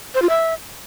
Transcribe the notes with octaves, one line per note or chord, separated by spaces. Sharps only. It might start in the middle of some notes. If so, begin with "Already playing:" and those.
C5
F4
E5